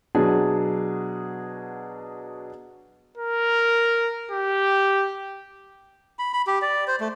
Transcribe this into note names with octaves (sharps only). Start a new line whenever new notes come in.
B2 F#3 D4 G#4
A#4
G4
B5
B5
G4
D5
C5
A3